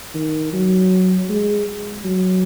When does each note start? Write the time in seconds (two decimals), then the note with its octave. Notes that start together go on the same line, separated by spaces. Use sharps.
0.15 D#3
0.53 F#3
1.30 G#3
2.05 F#3